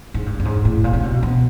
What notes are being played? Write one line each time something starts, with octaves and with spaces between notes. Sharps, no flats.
G#2
G2
G2
G#2
A2
A#2
C3
B2
B2